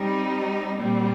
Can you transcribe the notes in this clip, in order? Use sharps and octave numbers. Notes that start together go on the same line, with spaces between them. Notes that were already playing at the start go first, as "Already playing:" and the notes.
Already playing: G3 C4 D#4
A#2 G3 C4